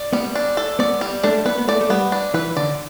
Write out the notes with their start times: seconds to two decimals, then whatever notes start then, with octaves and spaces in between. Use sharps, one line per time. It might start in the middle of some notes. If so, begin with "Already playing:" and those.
Already playing: D5
0.13 G3 B3
0.35 D4
0.57 A4
0.79 B3 D5
1.01 G3
1.23 A3 D4
1.46 B3 B4
1.58 B3
1.68 A3 D5
1.81 A3
1.90 G3 B3
2.12 D4
2.34 E3 B4
2.57 D3 D5